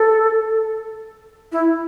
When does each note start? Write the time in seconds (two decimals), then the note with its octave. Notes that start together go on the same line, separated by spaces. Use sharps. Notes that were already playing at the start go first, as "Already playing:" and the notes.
Already playing: A4
1.52 E4